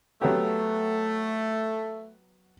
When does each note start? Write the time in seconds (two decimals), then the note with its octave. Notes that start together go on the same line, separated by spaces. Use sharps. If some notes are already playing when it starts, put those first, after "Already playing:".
0.22 F#3 A3 B3 G4